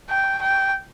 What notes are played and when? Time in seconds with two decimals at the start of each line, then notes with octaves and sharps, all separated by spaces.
0.10 G5
0.42 G5